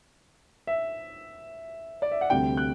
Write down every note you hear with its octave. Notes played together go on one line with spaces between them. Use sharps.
E5
D5
E5
F#5
D2 C3 G3 G5
F#6